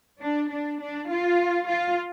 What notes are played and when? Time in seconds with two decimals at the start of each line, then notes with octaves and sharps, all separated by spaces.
0.22 D4
0.51 D4
0.81 D4
1.10 F4
1.69 F4